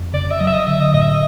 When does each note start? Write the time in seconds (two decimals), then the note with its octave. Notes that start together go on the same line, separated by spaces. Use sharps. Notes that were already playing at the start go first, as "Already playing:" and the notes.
Already playing: F2
0.13 C#3 D5
0.31 E5
0.40 F#3 D#5
0.47 E5
0.54 D#5
0.67 D3 E5
0.80 D#5
0.94 A2 D#5
1.01 E5
1.09 D#5